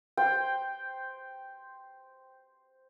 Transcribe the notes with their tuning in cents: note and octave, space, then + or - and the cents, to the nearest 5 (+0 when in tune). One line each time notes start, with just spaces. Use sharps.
C5 +0 G5 +0